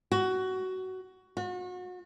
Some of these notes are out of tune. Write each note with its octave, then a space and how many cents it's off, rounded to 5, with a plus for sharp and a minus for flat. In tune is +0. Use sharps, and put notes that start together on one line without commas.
F#4 +15
F#4 -35